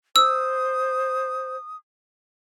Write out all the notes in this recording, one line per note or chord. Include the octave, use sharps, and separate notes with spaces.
C5 D#6 E6